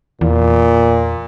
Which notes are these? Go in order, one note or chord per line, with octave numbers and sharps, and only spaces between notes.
E2 A#2